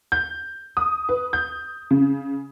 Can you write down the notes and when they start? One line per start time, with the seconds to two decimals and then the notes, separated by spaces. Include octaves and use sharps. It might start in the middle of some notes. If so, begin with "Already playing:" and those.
0.12 G6
0.77 D#6
1.09 B4
1.33 G6
1.91 C#3